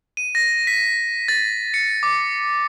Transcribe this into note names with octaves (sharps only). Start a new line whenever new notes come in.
D#7
A#6
B6
A6
C#7
D6